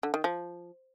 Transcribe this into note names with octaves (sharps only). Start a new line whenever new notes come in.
D3
D#3
F3